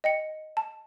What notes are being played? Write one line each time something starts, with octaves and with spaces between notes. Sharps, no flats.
D#5 G5 C#7
A5